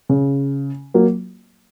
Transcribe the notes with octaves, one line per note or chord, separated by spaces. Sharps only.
C#3
F#3 A#3